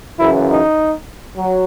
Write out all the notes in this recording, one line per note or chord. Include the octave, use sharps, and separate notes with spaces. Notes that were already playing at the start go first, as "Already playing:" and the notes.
F#2 C#3 E3 E4
D#4
F#3